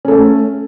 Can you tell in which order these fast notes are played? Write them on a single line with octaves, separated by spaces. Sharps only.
C#4 A4 A3